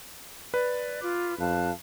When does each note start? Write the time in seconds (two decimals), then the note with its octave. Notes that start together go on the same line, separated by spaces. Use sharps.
0.54 B4 D5
1.01 F4 D6
1.39 F2 F5 A5 F#6